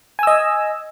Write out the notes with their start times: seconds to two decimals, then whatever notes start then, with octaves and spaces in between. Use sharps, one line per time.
0.19 G#5
0.23 E6
0.27 D#5